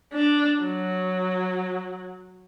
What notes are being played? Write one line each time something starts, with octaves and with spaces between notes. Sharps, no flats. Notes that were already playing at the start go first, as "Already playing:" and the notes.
D4
F#3